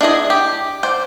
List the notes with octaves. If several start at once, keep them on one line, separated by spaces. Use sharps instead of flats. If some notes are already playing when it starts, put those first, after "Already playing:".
D4 E4 G#4 D#5
G4
C5 D5